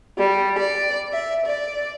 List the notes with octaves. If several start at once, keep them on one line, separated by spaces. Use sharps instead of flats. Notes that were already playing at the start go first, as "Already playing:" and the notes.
G3
D5
E5
D5